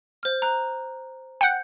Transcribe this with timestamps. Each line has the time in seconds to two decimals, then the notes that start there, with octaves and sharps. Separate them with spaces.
0.23 C5 F6
0.42 A#5 F#6
1.41 F#5 G5 G6 C#7